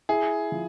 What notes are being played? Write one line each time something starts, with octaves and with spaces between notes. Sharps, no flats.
E4 G#4
F3